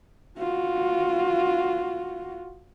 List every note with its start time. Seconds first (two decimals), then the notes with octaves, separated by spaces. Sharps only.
0.39 F4 F#4